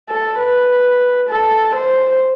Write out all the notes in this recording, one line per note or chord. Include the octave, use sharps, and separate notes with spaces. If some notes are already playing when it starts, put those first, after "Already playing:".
A4
B4
A4
C5